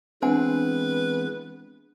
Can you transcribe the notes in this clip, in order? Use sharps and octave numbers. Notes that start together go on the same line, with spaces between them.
E3 G#3 B3 C4 D4 B4 F#5 G#5